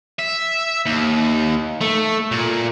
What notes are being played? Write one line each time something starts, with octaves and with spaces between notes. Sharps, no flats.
E5
D#2
A3
A#2